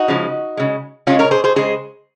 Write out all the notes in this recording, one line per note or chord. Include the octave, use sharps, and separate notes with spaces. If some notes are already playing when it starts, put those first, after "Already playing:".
Already playing: D#4 F#4
C#3 F3 G#3
C#3 G#3
C#3 G#3 C#4 F4
A#4 C#5
G#4 C5
G#4 C5
C#3 G#3 G#4 C5